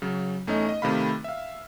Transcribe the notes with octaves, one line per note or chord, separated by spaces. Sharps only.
C#3 F#3
E2 A3 C#4 D#4 D#5
D#5
C3 D#3 A3 F5 B5
E5 F5